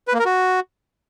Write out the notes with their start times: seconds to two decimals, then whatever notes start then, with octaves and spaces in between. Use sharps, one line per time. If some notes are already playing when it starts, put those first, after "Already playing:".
0.08 B4
0.14 A#3
0.20 A#4
0.26 F#4